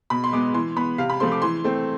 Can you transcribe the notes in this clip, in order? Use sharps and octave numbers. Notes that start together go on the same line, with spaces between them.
B2 B5
C6
G#3 B3 D6
E3 C6
B3 B5
C3 F5
B5
F3 A3 C4 C6
D6
E3 C6
A3 C4